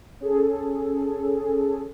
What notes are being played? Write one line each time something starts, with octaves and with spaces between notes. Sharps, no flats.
C#4 G#4 A4